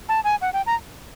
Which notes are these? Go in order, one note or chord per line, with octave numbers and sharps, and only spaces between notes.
A5
G#5
F#5
G5
A#5